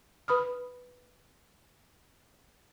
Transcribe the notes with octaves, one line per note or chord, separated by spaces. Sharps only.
B4 B5 D#6 F6